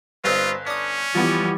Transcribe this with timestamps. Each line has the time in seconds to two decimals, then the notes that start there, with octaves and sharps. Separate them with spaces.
0.24 G1 G2 C4 D#4 F4
0.67 C#4 D4 D#6
1.15 E3 F3 G3 B3